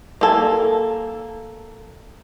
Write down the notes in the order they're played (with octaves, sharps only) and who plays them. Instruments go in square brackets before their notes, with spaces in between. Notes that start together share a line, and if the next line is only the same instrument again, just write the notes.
[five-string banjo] A#3 A4 G#5